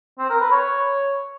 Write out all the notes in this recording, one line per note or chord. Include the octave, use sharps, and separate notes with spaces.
C4
A#4
B4
C#5